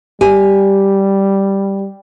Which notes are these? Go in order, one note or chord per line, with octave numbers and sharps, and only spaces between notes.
G3 G4 G#5